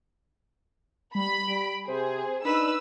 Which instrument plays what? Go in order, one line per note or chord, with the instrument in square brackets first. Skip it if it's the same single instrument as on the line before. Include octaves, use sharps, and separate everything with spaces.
[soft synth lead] G3 [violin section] B5
[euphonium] G3 [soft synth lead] D7
[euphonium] C3 [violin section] G#4 [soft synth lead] C5
[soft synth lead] D4 [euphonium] D#4 [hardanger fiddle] B4 B5 [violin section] E6